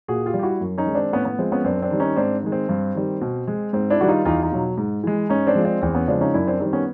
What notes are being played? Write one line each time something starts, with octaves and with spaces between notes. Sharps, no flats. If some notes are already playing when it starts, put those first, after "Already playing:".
A#2 F#4 G#4
F4 G4
G3
G4
E4 F#4
F#2
C#4 D#4
D#3 G#3
C4 D4
A2 B3 C#4
B3
F3 G#3 C4
B3 C#4
F#2 C4 D4
C4 D4
D#3 G3
C#4 D#4
G#2 C4 D4
D#3 G#3
C4
G2
D#3 G3
B2
G#3
G#2 C4
D4 E4
D#3 G3 F#4
D#4 F4
E2 D#4 F4
D#4 F4
B2 F#3
G#2
E3 G#3
G#2 C#4 D#4
C4 D4
F3 G#3
C4 D4
E2 C4
B3 C#4
C#3 F3 G#3 C4 D4
C#4 D#4
F#2 D4 E4
C4 D4
D#3 G3 C4
B3 C#4